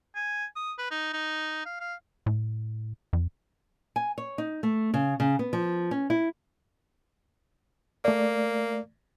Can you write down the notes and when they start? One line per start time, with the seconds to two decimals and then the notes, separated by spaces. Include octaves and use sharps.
0.15 G#5
0.56 D#6
0.78 B4
0.91 D#4
1.13 D#4
1.66 F5
1.80 F5
2.26 A2
3.13 F2
3.96 G#5
4.18 C#5
4.38 D#4
4.63 A3
4.94 C#3
5.20 C#3
5.39 B3
5.53 F3
5.91 C#4
6.10 E4
8.05 A3 A#3 D5